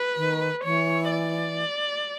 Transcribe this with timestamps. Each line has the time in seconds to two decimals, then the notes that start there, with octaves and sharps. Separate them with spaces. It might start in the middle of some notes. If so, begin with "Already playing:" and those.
Already playing: B4
0.17 D#3
0.64 E3 C#5
1.12 D5